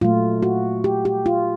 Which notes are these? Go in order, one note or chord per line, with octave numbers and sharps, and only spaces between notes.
A#2 F#3 A3 F4
F#4
G4
G4
F4